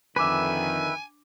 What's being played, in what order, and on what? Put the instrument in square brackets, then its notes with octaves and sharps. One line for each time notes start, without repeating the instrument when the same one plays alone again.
[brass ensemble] F2 D3 D#3 [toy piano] D4 D6 [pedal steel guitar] B4 E5 [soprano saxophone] G#5